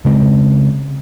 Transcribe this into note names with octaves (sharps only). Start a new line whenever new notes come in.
C#3 G#3 C4